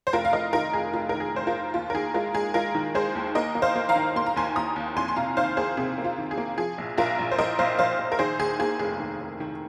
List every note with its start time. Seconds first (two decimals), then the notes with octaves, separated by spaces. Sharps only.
0.07 C5
0.13 F1 F4 A#4
0.25 F5
0.33 F1 A#4 D#5
0.53 D#3 F4 A#4
0.73 F1 G#4
0.93 F1 F4
1.09 D#3 A#4
1.20 G#4
1.34 F1 C5
1.47 F4 A#4
1.54 F1
1.74 D#2 F4
1.90 A#4
1.94 D#3 G#4
2.14 G#3 F4 A#4
2.34 G#3 G#4
2.54 G#3 F4 A#4
2.75 D#3
2.95 G#3 G#4 C5
3.15 D#2
3.35 A#3 A#4 D#5
3.55 A#3
3.62 C5 F5
3.76 A#3
3.89 F5 A#5
3.96 D#3
4.16 A#3 C6
4.26 A#5
4.36 D#2 G#5 C6
4.56 D#2 A#5 D#6
4.76 D#2
4.96 F2 G#5 C6
5.08 C6
5.16 C3 F5 A#5
5.37 D#3 C5 F5
5.57 A#3 G#4 C5
5.77 C3 G#4
5.98 A#3
6.05 F4
6.18 D#3
6.31 G#4
6.37 A#3
6.58 F3 G#4
6.78 A#1
6.98 A#1 F4 A#4
7.19 A#1
7.32 C5
7.38 A#1 A#4 D#5
7.59 A#1 C5 F5
7.79 A#1 C5 F5
7.99 A#1
8.12 A#4
8.19 D#3 G#4 C5
8.39 D#2 G#4
8.59 A#3 G#4
8.79 F1 G#4
9.00 D#3
9.20 F1
9.40 D#3